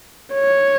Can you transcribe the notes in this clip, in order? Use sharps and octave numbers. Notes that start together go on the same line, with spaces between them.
C#5